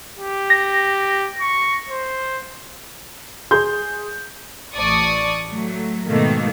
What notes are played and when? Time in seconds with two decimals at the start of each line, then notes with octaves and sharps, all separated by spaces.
0.16 G4
0.50 A#6
1.41 C#6
1.89 C5
3.51 G#4 C6 G6
4.75 A1 D5 A5 C#6 D#6
5.48 F#3 A3
6.06 G#2 B2 D#3 A3 A#3